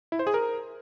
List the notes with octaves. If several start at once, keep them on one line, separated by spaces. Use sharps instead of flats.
E4
C5
G#4
A#4